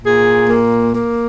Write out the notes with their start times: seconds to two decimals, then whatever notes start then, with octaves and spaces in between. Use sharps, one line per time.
0.03 A#2 G#4
0.49 A#3
0.94 A#3